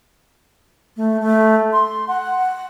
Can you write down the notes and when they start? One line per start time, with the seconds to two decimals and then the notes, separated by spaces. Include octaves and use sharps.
0.97 A3
1.21 A3
1.73 C6
2.08 F#5